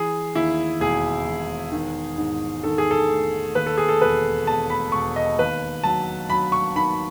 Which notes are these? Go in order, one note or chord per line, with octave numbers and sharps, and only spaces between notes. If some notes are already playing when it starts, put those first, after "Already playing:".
Already playing: E3 G#4
D#2 E4
E1 G#4
E1
D#3
G#2
D#3 A4
G#4
A4
A3
D#2 B4
A4
G#4
A4
E1 B4
E1 A5
B5
E1 C#6
D#5
D#2 B4
F#3 A5
F#3 B5
C#6
D#3 B5